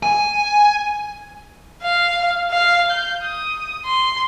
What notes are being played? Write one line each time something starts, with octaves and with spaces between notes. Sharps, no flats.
G#5
F5
F5
G6
D#6
C6